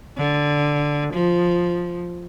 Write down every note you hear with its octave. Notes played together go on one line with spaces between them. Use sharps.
D3
F3